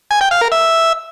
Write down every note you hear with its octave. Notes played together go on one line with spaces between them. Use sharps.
G#5
G5
F5
A#4
E5